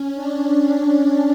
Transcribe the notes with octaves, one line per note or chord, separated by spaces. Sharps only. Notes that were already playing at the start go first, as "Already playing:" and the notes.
Already playing: C#4
D4